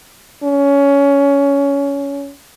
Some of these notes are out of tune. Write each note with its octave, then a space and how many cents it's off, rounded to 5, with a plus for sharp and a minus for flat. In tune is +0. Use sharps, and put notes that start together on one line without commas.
C#4 +20